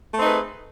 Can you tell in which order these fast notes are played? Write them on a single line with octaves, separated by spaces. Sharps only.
A3 C4 D#4 B4 G#4